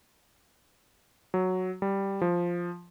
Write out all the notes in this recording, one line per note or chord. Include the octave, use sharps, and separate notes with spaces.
F#3
G3
F3